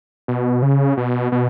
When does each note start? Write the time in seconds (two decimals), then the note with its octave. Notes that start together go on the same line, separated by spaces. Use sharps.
0.28 B2
0.62 C#3
0.97 B2
1.32 B2